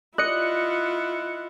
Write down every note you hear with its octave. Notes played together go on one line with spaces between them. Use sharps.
E4 F4 D#5 F#6 C#7